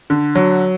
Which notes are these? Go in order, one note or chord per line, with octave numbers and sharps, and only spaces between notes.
D3
F#3